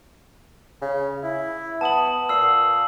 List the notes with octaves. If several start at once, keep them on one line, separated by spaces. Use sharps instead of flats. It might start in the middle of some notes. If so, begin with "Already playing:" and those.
C#3
E4
B3 A5 D#6 F#7
A#2 E6 C7